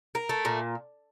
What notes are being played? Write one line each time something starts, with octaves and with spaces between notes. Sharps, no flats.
A#4
A3
A#2